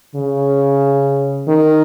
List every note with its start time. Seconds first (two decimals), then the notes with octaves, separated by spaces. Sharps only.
0.15 C#3
1.47 D#3